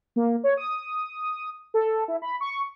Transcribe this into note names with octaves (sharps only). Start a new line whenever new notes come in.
A#3
C#5
D#6
A4
E4
B5
C#6